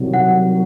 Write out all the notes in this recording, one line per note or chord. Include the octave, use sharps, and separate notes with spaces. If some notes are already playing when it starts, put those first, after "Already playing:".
Already playing: C2 C3 D#3 F#3
F#5